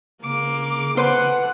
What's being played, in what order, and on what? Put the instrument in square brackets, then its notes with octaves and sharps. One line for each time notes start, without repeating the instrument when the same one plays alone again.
[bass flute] C#3 [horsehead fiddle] A#3 [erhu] D6
[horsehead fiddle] A4 F#5 [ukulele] B4 C5